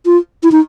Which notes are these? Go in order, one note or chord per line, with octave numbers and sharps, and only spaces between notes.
F4
E4
D#4